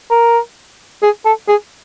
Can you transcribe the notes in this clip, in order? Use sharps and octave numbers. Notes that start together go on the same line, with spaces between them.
A#4
G#4
A4
G#4